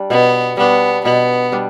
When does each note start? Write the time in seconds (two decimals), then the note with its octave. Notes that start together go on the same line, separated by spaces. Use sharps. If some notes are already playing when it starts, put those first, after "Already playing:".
Already playing: G3 D4
0.10 B2 B3
0.57 G3 B3 D4
1.04 B2 B3
1.52 G3 D4